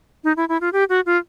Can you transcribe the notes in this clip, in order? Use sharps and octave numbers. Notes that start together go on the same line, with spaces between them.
D#4
E4
E4
F4
G4
F#4
F4